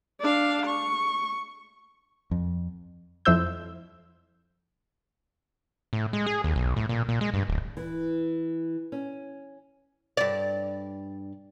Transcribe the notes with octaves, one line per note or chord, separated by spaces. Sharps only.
D4 F5
C#6
F2
F2 E4 C5 E6 G6
A2
G#3
G#4
D#2
B1
A2
A#2
A#2
G#3
G2
D1
E3
C#4
G2 D5